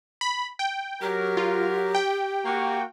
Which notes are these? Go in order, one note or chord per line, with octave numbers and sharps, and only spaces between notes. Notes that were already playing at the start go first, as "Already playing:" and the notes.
B5
G5
F#3 G4 A#4
F4
G5
A#3 F#4